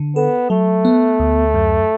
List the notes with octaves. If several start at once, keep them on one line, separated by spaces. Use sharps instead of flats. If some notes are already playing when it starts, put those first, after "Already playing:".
Already playing: D3
B3 A4
F#3 A3
B3
D2
F#2